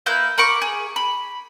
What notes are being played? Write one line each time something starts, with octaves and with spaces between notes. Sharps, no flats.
A#3 E4 B4 G6
A#4 B5 C#6 D6
G#4
B5